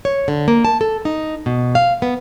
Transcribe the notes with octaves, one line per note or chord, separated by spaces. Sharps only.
C#5
D3
A#3
A5
A4
D#4
B2
F5
B3